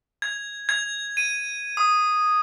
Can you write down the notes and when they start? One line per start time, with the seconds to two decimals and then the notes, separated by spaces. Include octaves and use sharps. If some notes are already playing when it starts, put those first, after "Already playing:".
0.22 G#6
0.69 G#6
1.17 D#7
1.77 D#6